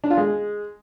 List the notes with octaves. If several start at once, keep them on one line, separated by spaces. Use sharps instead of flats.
D4
F4
G#3